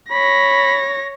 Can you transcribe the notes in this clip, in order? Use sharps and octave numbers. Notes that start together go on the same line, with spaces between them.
C#5 B5 A#6